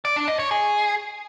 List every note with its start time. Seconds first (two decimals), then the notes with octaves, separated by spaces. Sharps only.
0.05 D5
0.16 D4
0.28 D#5
0.39 C#5
0.51 G#4